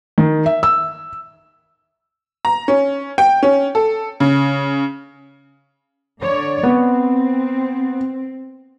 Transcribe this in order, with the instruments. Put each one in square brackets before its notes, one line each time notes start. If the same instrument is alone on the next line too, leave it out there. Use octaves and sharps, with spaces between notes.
[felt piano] D#3
E5
E6
[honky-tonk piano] A#5
C#4
G5
C#4
A4
C#3
[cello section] D3 C#5 D5
[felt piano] B3 [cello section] C4